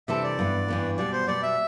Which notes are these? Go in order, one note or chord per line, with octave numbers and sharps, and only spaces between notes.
C3 E3 G3 D4 A4 E5
D5
G2 E3 B3
G2 E3 B3
B2 G3 B3 D5
C5
B2 G3 B3 D5
E5